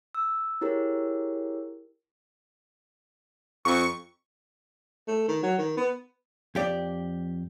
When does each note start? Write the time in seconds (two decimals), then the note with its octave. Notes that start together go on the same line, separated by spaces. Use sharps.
0.15 E6
0.61 E4 G4 G#4 A#4 C#5
3.65 F2 C#6
5.08 A3
5.28 D#3
5.43 F#3
5.58 D#3
5.77 B3
6.55 F2 G4 D5